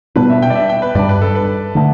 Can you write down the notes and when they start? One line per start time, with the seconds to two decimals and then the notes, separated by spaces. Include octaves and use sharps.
0.15 B2 G3 B3 D4 B4
0.30 E5
0.42 G5
0.50 D5
0.55 E5
0.69 G5
0.82 B4
0.95 G2 G3 D4 D5
1.09 B4
1.22 A4
1.35 B4
1.75 D3 A3 D4